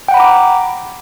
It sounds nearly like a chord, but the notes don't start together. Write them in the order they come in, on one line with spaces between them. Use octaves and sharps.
G5 F#5 B5 A#5 D6